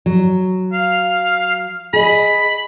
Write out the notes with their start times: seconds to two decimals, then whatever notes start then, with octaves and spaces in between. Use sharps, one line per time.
0.06 F#3
0.73 F5
1.93 G#4 D#5 B5